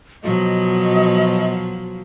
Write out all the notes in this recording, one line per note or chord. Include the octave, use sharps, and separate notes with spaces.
B2 F3 F#3 D#5